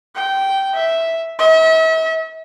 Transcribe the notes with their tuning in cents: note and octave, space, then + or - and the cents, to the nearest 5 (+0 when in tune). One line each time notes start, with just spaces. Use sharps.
G5 -15
E5 -5
E5 -40